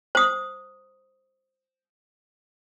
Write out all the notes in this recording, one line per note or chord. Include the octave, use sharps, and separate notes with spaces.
C5 D#6